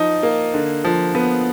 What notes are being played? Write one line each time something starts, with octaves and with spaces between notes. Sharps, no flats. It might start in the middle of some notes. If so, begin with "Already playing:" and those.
Already playing: F3 D#4
A#3
D3
F3
B3